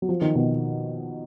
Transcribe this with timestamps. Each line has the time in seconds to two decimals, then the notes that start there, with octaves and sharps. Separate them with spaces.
0.02 F#3
0.09 F3
0.21 D#3
0.35 B2